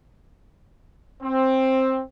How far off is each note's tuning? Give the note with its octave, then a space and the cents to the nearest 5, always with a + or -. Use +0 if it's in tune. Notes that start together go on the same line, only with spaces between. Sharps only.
C4 +10